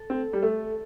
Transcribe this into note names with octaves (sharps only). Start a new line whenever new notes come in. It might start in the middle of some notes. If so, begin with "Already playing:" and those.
Already playing: A4
C4
G3
A3